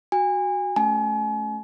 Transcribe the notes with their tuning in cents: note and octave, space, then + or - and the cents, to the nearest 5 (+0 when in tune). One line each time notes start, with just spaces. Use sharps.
F#4 +0 G#5 -30
A3 -25 C#4 +0 G#5 +40